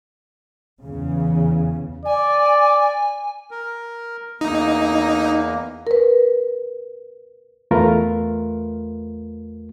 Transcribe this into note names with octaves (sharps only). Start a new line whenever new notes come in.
E2 C#3
D5 G#5
A#4
E2 A#3 D#4
A#4 B4
E2 A3 F4 A#4 B4